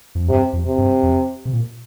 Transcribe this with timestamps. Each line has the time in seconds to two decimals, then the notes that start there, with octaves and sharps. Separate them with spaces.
0.15 F2
0.29 G2 C3
0.53 F2
0.65 C3
0.78 G2
1.03 F2
1.45 C3
1.53 A#2